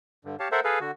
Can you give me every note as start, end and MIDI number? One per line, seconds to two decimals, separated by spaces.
0.25 0.36 43
0.25 0.36 50
0.39 0.48 67
0.39 0.48 73
0.39 0.48 77
0.39 0.48 81
0.52 0.60 69
0.52 0.60 70
0.52 0.60 72
0.52 0.60 76
0.52 0.60 78
0.64 0.79 68
0.64 0.79 69
0.64 0.79 71
0.64 0.79 77
0.81 0.91 50
0.81 0.91 66